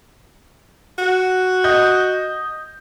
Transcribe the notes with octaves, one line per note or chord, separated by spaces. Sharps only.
F#4
D#5 G6